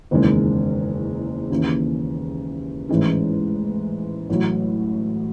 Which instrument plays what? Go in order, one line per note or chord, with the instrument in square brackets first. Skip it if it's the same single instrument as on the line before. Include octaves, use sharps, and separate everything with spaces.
[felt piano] F#1 E2 D#3 G#3 C#4
D#2 C#3 E3
A1 G#2 E3 G#3 C#4
A1 A2 F#3